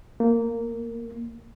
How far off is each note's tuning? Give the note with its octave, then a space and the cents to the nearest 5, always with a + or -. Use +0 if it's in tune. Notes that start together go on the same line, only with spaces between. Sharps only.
A#3 -10